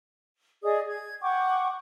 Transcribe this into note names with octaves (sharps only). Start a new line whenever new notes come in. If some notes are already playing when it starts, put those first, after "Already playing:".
G#4 D5 D#5 D#6
G#6
F#5 G5 C#6 D6